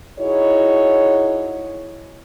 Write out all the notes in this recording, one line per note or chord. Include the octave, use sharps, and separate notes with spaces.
D#4 E4 F#4 G#4 C#5